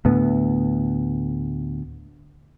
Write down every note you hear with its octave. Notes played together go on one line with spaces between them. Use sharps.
D2 A2 B3